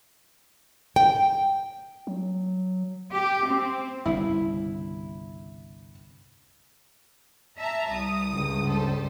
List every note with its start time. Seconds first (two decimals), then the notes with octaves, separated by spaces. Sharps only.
0.96 G5
2.07 F#3
3.14 G4
3.48 C4
4.06 G1 C2 C#3 E4
7.58 E5 A5 A#5
7.91 C2 D#6
8.31 C#2 G2
8.67 G3 A4 C5